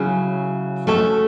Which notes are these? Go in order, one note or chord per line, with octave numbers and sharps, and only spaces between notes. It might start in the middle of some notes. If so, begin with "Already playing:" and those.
Already playing: C#3 F#3 C#4 E4
A3 C#4 F#4 A4